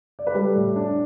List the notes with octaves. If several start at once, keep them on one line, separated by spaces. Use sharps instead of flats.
D5
B4
G3 A4
A2
D4